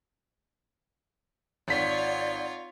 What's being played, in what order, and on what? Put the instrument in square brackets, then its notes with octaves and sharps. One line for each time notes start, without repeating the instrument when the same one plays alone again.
[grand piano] G#1 B6 [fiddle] F4 C#5 [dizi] D5